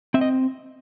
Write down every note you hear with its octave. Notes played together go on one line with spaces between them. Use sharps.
C4 E5
D#5